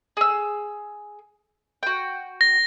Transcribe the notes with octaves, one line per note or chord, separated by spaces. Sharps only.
G#4 E6
F#4 G5
A#6